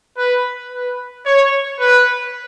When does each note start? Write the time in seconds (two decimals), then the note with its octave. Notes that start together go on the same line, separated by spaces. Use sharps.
0.18 B4
0.72 B4
1.26 C#5
1.80 B4